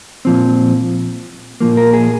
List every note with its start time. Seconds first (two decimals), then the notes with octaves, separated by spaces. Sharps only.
0.25 A#2 F3 C4
1.61 A#2 F3 A#3
1.77 A#4
1.94 G#4